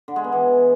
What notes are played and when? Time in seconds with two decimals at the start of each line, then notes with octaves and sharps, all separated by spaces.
0.08 D3
0.16 G#3
0.24 B3
0.32 E3